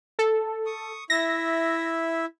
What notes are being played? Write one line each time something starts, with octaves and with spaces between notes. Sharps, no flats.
A4
C#6 D#6
E4 E5 A#6